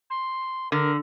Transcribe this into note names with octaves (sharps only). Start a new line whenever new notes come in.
C6
D3 A#4